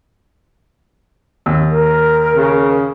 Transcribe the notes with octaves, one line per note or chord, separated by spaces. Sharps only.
D#2
A#4
C#3